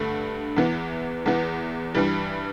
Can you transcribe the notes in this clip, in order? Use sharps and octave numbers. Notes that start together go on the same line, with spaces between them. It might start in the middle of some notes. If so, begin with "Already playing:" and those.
Already playing: G2 D3 A3
E2 E3 B3
E2 E3 B3
G2 E3 G3